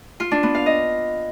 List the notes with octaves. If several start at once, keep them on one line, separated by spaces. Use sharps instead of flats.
F4
D4
B3
F5
D#5